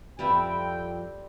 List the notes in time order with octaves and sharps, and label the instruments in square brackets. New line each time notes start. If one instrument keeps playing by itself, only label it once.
[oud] F2 F4 B4 [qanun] G3 C4 E5 [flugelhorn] G5